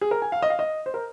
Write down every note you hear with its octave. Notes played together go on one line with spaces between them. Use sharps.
G#4
A#4
G#5
F5
D#5
F5
D#5
C5
A#4